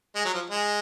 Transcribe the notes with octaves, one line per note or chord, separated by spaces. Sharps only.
G#3
F#3
F3
G#3